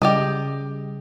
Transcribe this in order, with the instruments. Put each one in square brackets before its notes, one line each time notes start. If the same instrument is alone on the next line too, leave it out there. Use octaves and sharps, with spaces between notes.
[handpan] C#3 [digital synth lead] G3 [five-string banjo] G4 D5 D#5